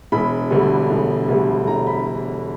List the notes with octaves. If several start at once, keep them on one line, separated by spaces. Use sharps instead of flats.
E1 B5
D2 D3 G3
E1
D2 D3 G3
E1 A#5
B5